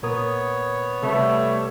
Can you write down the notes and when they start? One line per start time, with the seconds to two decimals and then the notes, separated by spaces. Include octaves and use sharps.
0.03 A#2 B3 A#4 C#5 D#6
1.03 C3 G3 A3 B4